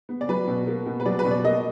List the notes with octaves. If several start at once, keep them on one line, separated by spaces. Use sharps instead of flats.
B3
D5
F#3 B4
B2
A#3
B2
B4
F#3 D5
B4
B2
D5
A#3 D#5